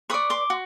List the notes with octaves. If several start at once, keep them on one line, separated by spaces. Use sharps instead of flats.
B4 D5 C#6 D#6
C6 D6
F#4